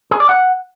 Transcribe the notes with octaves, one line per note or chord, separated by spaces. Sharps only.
G#4
D5
F#5